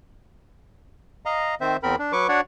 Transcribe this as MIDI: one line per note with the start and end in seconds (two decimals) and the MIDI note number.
1.26 1.55 75
1.26 1.55 77
1.26 1.55 82
1.61 1.77 51
1.61 1.77 60
1.61 1.77 72
1.61 1.77 76
1.83 1.96 40
1.83 1.96 60
1.83 1.96 70
1.83 1.96 83
1.99 2.12 62
2.12 2.27 54
2.12 2.27 71
2.12 2.27 85
2.12 2.27 86
2.29 2.41 62
2.29 2.41 66
2.29 2.41 73
2.29 2.41 74
2.29 2.41 78